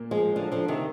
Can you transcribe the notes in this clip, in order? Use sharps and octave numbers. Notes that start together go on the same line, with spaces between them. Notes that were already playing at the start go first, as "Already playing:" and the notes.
Already playing: A#2 A#3
F3 G#3
D3 F3
D3 F3
C3 D#3